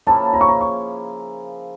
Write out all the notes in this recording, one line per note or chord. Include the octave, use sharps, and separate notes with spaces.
C#3 F3 A#3 E4 A5
A#5
C#6
A#5
C#6